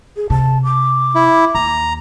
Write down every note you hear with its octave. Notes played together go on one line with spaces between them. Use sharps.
G#4
C3 A5
D6
E4
D#2 A#5